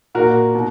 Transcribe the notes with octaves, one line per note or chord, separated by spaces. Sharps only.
A#2 A#3 F#4 A#4
B2